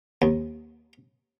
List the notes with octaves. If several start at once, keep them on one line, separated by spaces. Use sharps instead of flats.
D#2